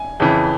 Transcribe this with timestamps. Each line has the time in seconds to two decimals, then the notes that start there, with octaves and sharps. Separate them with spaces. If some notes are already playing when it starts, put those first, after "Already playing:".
Already playing: G#5
0.20 F2 C#3 E3